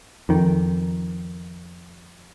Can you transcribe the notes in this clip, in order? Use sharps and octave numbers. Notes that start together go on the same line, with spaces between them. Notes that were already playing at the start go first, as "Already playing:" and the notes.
F2 D#3